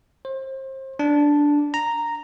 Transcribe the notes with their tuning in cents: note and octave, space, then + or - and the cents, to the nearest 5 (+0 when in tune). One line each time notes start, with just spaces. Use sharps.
C5 +30
D4 -5
A#5 -5